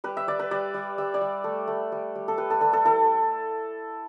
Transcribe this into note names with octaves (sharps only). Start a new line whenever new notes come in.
G3 B4
E5
G3 D5
B4
G3 D5
G3
G3 E5
D5
G3
A3
A3
G3
G3
A4
G3 B4
A4
G3 A4
A4
E4 A4